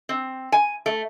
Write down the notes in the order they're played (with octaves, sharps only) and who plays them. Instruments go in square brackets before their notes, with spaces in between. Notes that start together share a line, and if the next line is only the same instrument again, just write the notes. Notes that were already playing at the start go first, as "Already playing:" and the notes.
[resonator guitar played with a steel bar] C4
G#5
A3